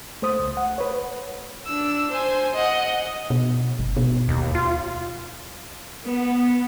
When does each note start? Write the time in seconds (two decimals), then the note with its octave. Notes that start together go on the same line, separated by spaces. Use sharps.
0.22 A3 C5 D#6
0.39 C#2
0.57 F#5
0.78 B4 C#5
1.67 D4 E6
2.11 C5 G#5
2.54 D#5 F#5
3.30 B2
3.79 G1
3.97 B2
4.28 D#2
4.55 F4
6.04 B3